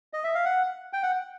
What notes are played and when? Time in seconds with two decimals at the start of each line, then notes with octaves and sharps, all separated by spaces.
0.13 D#5
0.24 E5
0.34 F5
0.45 F#5
0.93 G5
1.03 F#5